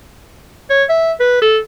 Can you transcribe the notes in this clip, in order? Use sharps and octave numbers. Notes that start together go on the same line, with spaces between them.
C#5
E5
B4
A4